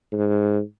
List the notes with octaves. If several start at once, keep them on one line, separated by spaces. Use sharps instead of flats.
G#2